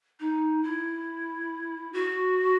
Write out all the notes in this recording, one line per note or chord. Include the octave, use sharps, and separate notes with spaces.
D#4
E4
F#4